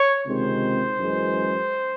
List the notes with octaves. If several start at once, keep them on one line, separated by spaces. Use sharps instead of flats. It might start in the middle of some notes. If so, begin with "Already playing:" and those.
Already playing: C#5
C#2 C3 D#3 G#3 C5
F#2 E3 G#3